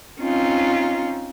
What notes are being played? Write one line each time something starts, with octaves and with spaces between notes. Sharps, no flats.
C4 C#4 D#4 F4